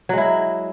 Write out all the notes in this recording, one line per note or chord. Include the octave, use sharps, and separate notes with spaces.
F#3 G#3 E4